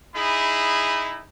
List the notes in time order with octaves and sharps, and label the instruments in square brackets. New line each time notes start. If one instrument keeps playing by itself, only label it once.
[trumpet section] D#4 E4 G#4 B5